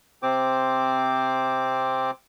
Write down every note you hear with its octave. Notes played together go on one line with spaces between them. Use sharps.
C3 C4 C5 D6